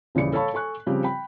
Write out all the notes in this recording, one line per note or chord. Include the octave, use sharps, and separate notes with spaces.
D#1 C#3 E3 D5 C#7
A4 C#5 F5 A5 B5 C#6
A4 G#5 C#6 F#6
C#3 F3 G3 C4 G4
G5 B5